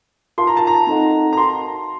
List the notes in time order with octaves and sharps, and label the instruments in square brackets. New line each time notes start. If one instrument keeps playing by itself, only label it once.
[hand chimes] F4 A#4 F5 A5 [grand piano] C6
[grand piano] A#5
A5
A#5
[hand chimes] C4 D#4 A4 D#5 F#5
[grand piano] A#5
[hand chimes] F#4 A#4 F5 A5 [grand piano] C6